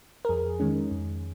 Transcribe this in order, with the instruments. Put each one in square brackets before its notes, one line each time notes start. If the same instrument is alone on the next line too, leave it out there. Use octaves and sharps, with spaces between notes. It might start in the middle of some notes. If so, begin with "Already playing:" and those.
[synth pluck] A#4
F2 G#4
D#3 G#3 C#4
F2